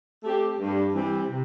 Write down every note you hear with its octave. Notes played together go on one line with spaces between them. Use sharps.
A3 C4 G4
G2
E3 G3 C4
C3